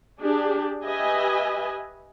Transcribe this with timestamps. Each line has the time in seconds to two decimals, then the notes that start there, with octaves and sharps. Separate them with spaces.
0.21 D4 G4 G#4
0.83 G4 B4 D#5 E5 G#5